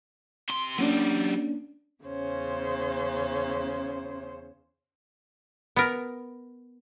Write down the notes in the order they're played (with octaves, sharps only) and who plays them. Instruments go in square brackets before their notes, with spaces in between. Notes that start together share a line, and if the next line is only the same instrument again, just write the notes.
[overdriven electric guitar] C3 C6
[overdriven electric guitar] F#3 G4 [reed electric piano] A#3 C#4 D4
[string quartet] E2 C#3 C#4 C5
[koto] B3 A#4